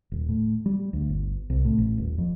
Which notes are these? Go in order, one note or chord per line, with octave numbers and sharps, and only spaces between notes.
D#1
A2
G3
D2
G1
C2
A2
A1
D#1
F2